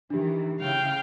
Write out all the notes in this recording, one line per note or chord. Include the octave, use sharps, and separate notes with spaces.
D#3 E3 D4 G4
C#3 E4 F5 G5